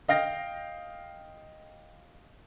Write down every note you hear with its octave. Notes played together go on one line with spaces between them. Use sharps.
D#5 F5 G5 A#6